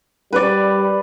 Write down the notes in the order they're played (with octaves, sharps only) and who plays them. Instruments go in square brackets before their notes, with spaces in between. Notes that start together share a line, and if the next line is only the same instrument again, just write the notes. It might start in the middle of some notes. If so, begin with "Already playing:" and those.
[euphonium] G3 [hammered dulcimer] B4 D5